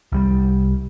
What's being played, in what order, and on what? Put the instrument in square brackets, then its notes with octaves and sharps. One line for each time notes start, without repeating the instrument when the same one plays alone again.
[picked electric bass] C2 G3